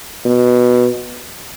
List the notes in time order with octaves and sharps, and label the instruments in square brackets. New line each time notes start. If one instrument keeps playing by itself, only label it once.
[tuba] B2